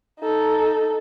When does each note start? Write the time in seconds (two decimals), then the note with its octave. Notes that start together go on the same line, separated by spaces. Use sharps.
0.20 D#4 A4